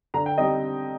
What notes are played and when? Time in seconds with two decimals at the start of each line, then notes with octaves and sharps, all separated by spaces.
0.14 D3 A#5
0.26 G5
0.38 G3 C4 D#4 D#5